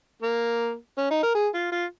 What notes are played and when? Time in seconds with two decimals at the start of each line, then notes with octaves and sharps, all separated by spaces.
0.22 A#3
0.98 C#4
1.11 D#4
1.23 A#4
1.35 G#4
1.54 F4
1.72 F4